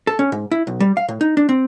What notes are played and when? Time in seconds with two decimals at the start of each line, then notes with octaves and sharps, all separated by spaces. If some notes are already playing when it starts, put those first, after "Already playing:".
0.07 A4
0.19 C#4
0.32 G#2
0.51 E4
0.67 B1
0.80 G3
0.97 F5
1.08 A2
1.21 D#4
1.37 D4
1.49 C4